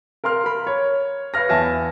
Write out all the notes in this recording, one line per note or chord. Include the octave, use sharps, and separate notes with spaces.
A#4 F5 C6 F6
A#4 B5
C#5
B4 C#5 F5 F6 A#6
E2 E5 G#5 A5 F6 A#6